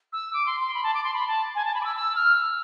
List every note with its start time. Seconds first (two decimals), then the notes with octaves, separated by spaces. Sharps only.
0.13 E6
0.33 D6
0.46 C6
0.60 C6
0.74 B5
0.83 A5
0.94 D6
1.04 C6
1.14 B5
1.27 A5
1.55 G#5
1.65 A5
1.74 B5
1.81 D6
1.85 E6
1.96 E6
2.15 F6
2.35 E6